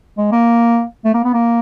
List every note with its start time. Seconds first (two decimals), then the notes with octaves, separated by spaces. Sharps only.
0.17 G#3
0.32 A#3
1.05 A3
1.14 A#3
1.24 B3
1.34 A#3